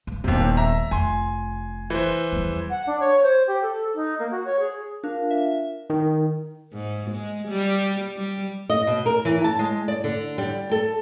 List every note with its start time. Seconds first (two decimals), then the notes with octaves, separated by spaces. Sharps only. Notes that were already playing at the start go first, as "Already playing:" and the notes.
0.07 G2
0.24 D#1 D#2 C3 B3
0.57 E5 A#5
0.91 F1 F4 G#5 C6
1.90 E3 C5
2.32 E2 G3
2.70 F#5
2.87 D4
3.00 C#5
3.23 C5
3.47 G4
3.62 A4
3.95 D#4
4.19 A#3
4.31 F#4
4.45 C#5
4.60 G#4
5.04 D4 F4 A#4 F5
5.31 E5
5.90 D#3
6.73 G#2
7.11 G#3
7.48 G3
8.17 G3
8.70 D#5
8.87 B2
9.06 A#4
9.25 E3
9.44 A5
9.59 G#3
9.88 D5
10.04 D3
10.38 G3
10.71 A4